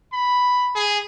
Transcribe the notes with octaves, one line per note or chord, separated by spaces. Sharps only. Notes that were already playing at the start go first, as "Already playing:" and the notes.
B5
G#4